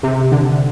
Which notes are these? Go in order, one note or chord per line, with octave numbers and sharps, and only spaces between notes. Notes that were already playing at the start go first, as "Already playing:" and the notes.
C3
D3